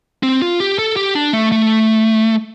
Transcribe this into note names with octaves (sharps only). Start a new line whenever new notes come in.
C4
F4
G4
A4
G4
D4
A3
A3